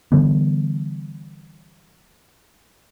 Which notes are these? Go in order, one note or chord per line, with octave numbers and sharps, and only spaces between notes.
D3 E3 G3 B3